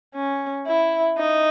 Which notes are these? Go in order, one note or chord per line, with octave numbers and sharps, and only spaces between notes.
C#4
E4
D#4